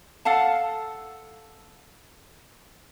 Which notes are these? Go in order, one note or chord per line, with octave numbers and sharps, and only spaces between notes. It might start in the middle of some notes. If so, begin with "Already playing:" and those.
A4 F5 F#5 A5